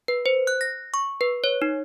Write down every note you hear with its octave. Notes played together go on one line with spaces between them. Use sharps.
B4
C5
F#6
A#6
C#6
B4
C#5
D#4